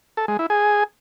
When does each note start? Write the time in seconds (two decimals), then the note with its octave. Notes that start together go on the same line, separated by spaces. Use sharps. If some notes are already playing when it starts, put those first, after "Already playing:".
0.17 A4
0.28 G#3
0.39 E4
0.50 G#4